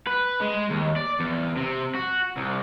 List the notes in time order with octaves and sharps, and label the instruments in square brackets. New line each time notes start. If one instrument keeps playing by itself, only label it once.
[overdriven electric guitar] B4
G#3
D#2
D5
E2
C3
F#4
C2